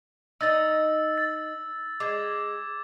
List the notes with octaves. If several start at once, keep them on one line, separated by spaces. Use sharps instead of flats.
D#4 D#5 E6 A6
A6
G#3 D6 G#6